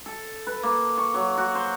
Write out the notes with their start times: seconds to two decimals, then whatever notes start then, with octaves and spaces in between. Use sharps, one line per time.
0.06 A4
0.47 B4
0.63 A#3
0.98 C#6
1.14 F#3
1.38 F#4
1.55 C5